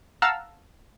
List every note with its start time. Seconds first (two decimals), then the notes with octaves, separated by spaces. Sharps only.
0.22 F5 F#5 A5 A#5 E6 F6